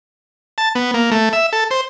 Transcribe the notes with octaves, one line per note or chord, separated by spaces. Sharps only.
A5
B3
A#3
A3
E5
A4
C5